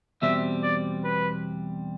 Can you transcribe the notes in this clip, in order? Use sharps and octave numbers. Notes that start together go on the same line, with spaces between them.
E2 B2 G3 C4 E5
D5
B4